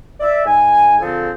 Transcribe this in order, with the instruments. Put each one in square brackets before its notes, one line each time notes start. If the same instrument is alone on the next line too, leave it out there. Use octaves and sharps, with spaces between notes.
[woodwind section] D5 E5
G#2 G#5
D3 F3 C4 G#4 A4